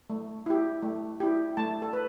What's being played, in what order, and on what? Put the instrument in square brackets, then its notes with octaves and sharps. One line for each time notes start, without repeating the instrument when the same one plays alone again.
[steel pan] A3
E4 G4
A3
E4 G4
A3 A5
A4
B4